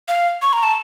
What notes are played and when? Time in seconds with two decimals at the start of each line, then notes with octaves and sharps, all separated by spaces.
0.08 F5
0.42 C#6
0.53 A#5
0.63 A5